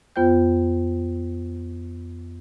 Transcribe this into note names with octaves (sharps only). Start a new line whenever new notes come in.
F2 B3 F4 C5 G5 G6